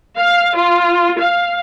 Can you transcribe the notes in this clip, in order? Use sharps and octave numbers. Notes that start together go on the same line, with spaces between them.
F5
F4
F5